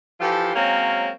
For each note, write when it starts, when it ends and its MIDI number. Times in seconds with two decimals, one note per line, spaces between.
0.20 0.51 52
0.20 0.51 53
0.20 0.51 65
0.20 0.51 67
0.20 0.51 69
0.54 1.09 54
0.54 1.09 56
0.54 1.09 58
0.54 1.09 60
0.54 1.09 61